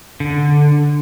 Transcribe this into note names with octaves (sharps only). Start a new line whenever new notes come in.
D3